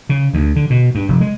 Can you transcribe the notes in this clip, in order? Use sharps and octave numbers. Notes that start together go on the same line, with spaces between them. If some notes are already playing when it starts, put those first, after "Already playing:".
C#3
D2
D3
B2
G2
F1
G#3